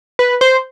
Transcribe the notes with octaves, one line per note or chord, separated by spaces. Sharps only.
B4
C5